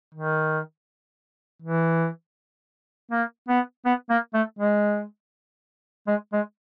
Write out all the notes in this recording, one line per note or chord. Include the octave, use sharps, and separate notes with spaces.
D#3
E3
A#3
B3
B3
A#3
A3
G#3
G#3
G#3